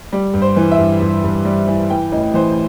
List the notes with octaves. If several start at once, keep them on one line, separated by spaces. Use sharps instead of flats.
G3
G2
C5
E3
E5
G2
G2
G2
G3
E3
E3 G5
A1 D#5
E3 C5